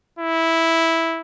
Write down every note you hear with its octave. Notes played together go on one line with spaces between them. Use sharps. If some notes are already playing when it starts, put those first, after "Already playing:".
E4